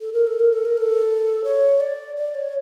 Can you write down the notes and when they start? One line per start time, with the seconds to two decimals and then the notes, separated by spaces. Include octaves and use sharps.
0.01 A4
0.13 A#4
0.27 A4
0.40 A#4
0.53 A4
0.65 A#4
0.77 A4
1.44 C#5
1.80 D5
2.16 D5
2.34 C#5